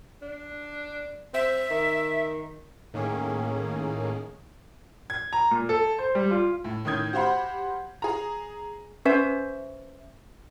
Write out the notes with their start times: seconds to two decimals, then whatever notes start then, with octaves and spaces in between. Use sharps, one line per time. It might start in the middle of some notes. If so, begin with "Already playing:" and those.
0.22 D4
1.34 C4 E5
1.70 D#3
2.94 A2 D#3 A#3 C#4 G#4
5.10 G#6
5.33 A#5
5.51 A#2
5.69 A4
5.99 C5
6.15 G3
6.31 F4
6.64 A2
6.85 A2 D#3 C#4 D#6 G6 G#6
7.13 F#4 G4 C5 F5 F#5 B5
8.02 G#4 A#5
9.05 C#4 B4 C5 E5